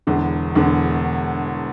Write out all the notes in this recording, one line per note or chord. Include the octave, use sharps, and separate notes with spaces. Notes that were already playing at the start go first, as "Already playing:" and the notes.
E1 E2 D3
E1 E2 D3